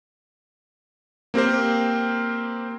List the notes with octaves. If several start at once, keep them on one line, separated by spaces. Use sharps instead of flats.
A#3 C4 G4 A#4 C5